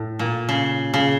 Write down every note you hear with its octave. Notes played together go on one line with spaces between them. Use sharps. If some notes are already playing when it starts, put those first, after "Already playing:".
Already playing: A2
A#2
C#3
C#3